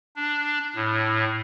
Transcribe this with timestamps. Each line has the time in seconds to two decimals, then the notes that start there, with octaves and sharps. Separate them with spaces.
0.16 D4
0.75 A2